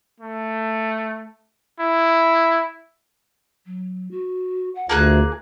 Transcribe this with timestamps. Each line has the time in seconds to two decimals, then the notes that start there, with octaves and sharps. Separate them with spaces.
0.20 A3
1.80 E4
3.66 F#3
4.11 F#4
4.75 F#5
4.89 D2 A#3 F4 G#4 F#6